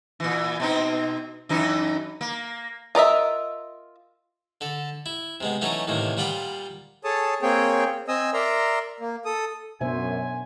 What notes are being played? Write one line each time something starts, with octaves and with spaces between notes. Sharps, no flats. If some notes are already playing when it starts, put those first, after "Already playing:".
A#2 E3
B2 C4 D#4
F#2 E3 D#4
A#3
F4 A#4 D#5 E5
D3 A4
E4
C3 G#3 B3
E3 F#3 A3 C#4 D#4 C#5
A2 C3 D#3 E3 A#3
A#2 G3 F4 F#5 G5 B5
G#4 A4 C#5 A5 D#6
A#3 C4 G#4 C#5 G5
C4 D#5 G#5 D#6 E6
A#4 D5 E5 A#5 C6
A#3
A4 D#6
F#2 B2 B3 D4 C5 E5 G#5